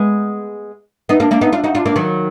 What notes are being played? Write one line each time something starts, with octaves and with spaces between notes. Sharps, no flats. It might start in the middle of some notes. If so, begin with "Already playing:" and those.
Already playing: G#3 B3
B3 D#4
A#3 D4
A#3 D4
B3 D#4
D4 F4
D#4 F#4
D4 F4
A#3 D4
D#3 F#3